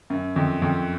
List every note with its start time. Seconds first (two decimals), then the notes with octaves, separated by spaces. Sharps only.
0.10 F#2
0.36 F2
0.62 F2